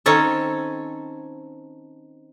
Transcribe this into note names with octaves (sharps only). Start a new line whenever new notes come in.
D#3 C4 C#4 A4